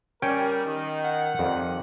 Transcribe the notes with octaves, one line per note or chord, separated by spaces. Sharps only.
G3 C#4 A#4 G5
D#3
F#5
F2 D#3 G3